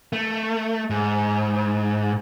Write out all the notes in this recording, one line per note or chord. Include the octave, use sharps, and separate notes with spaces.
A3
G#2